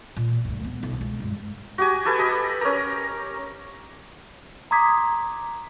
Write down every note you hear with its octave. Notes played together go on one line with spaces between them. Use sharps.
A#2
D2 G2
B3
B1
C#2
G2 G#3
F#4 G4 G#5
G4 A4 B4 G#5
D#5 B5
C#4 A#4
A#5 C6 D6 D#6 G#6 B6